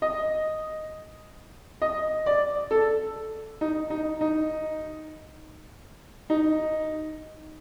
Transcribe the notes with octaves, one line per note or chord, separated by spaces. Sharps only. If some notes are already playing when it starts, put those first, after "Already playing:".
D#5
D#5
D5
A4
D#4
D#4
D#4
D#4